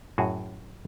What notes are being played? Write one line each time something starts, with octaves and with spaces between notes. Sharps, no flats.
F#2 A2 F#4 G#4 G#5